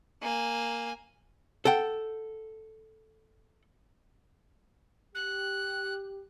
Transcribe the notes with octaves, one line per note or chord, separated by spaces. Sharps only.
A#3 G#5
A4 F#5 G5
G4 F#6